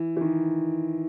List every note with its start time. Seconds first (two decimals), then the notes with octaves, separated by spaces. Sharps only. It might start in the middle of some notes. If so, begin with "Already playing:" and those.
Already playing: E3
0.17 E3
0.21 D#3